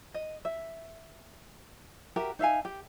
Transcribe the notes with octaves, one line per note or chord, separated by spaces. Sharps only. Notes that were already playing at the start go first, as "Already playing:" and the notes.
D#5
E5
F#4 G4 A#4 E5
D#4 E5 F5 G#5
G4